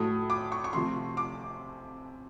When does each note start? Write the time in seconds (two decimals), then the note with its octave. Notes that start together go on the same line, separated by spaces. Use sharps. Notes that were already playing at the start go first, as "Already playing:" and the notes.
Already playing: A2 F#3 A3 D#6
0.30 D6
0.52 C#6
0.64 C#6
0.73 C3 F3 A3 C6
1.17 D6